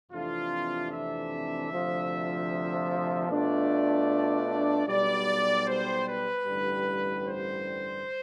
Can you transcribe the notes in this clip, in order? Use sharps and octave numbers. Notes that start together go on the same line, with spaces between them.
F2 C3 E3 A3 D4 F4
E5
D2 C3 F3
B2 A3 D4 F4 D5
B1 B2 G3 D5
C5
B4
A1 G2 D3 G3
C5